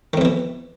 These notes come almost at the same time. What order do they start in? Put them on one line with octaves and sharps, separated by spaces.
D#3 F2 E3 B2